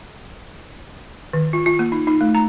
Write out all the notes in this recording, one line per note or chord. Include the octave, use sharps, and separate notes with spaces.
D#3
F4
F4
A#3
D#4
D#4
A3
A#5